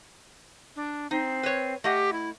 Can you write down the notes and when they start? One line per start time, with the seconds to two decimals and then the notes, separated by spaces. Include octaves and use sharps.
0.76 D4
1.11 C4 D#4
1.43 B4 C#5
1.84 A3 G4 D#5 F#5
2.13 E4